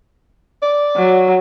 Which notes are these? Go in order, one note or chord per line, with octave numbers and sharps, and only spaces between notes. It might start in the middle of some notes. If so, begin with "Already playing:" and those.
D5
F#3